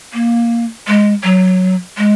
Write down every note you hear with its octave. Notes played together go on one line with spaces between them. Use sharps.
A#3
G#3
F#3
G#3